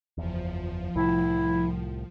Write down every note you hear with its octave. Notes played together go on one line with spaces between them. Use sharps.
F#1 E2 F3
C2 A2 E4